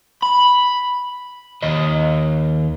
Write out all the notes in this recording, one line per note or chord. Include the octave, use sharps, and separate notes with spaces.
B5
D#2 D#5